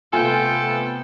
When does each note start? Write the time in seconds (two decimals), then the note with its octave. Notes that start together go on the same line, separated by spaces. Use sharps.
0.13 C3 A3 B3 F4 A4 G5 G#5